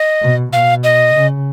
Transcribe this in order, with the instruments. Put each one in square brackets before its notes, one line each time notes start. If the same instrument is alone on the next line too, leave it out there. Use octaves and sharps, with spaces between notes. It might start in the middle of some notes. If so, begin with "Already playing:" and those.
Already playing: [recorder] D#5
[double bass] B2
[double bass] B2 [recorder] F5
[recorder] D#5
[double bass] C#3